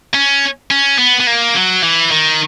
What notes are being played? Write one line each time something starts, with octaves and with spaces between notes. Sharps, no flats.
C#4
C#4
B3
B3
A#3
F#3
E3
D#3